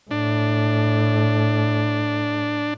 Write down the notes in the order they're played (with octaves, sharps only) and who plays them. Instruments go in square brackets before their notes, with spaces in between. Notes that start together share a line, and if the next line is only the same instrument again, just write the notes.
[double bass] A2 [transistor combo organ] D4